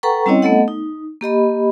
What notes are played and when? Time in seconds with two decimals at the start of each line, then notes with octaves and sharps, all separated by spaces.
0.03 A4 B4 F#5 G5 A#5 C#6
0.26 G3 C4 C#4 E4 C#5 D#5
0.42 A3 B3 A4 D#5 F#5
0.68 D#4
1.21 A#3 G4 D#5 B5